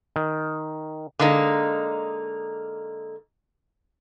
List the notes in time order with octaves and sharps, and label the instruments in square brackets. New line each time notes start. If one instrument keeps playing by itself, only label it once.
[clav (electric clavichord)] D#3
[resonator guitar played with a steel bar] D3 G#3 A#3 D#4